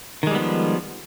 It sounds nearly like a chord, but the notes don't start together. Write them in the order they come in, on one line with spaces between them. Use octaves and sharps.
D#3 G#3 G3 B3 F3